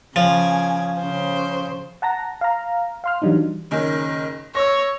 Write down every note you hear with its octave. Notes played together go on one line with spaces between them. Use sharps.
C#3 F3 G#5
C#3 C5
F#5 A5 A#5 A#6
F5 A#5
F5 C6 F6
E3 F#3 G3 D4 D#4
F#1 D#3 C#4
C#5 E6 A#6